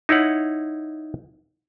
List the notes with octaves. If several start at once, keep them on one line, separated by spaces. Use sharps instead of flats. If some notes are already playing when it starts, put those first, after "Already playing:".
D#4 E4 C#5 F#5